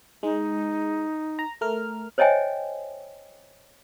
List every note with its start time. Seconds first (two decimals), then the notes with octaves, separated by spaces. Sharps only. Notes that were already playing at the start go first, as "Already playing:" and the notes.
0.23 G#3 D#4
1.39 A#5
1.61 A3 A#4 F6
2.18 C5 C#5 D#5 E5 G5 G#5